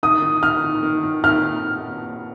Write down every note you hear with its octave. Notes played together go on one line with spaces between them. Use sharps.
D#3 D#6
D#3
D#3 F6
D#3
D#3
D#3
D#3 F6